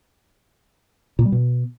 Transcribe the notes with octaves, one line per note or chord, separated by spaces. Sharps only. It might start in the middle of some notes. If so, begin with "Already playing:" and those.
A#2
G3
B2